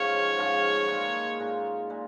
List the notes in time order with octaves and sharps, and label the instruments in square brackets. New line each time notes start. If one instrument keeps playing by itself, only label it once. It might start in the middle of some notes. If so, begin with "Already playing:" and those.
Already playing: [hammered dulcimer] G#2 F3 C#4 F4 [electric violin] C#5
[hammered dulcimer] G#2 F3 C#4 F4
A#2 G#3 D#4
A#2 G#3 D#4
A#2 G#3